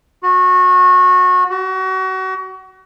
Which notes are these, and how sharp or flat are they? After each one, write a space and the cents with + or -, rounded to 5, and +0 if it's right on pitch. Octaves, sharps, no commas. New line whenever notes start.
F#4 -25
F#4 +30